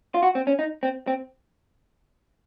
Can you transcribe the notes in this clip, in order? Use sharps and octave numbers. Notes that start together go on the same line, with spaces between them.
F4
F#4
C4
C#4
D#4
C4
C4